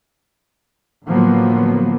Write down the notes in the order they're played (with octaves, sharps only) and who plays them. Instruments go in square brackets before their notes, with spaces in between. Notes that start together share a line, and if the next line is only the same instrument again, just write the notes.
[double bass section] A2 D3 F3 F#3 A#3 B3